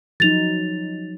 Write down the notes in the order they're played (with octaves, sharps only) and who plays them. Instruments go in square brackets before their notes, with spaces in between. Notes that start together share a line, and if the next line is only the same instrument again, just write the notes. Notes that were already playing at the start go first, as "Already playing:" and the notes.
[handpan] F3 F#3 D#4 [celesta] A6 F7